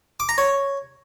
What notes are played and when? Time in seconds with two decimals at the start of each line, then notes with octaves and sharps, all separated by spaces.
0.20 D6
0.29 A#5
0.38 C#5